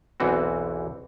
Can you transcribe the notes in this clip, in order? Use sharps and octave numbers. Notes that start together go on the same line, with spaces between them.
B1 E2 E3 C4 F#4